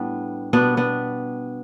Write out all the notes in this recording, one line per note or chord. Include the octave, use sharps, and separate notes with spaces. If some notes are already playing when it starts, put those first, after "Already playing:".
Already playing: A2 G3 B3 D4
B2 G3 B3 D4
B3 D4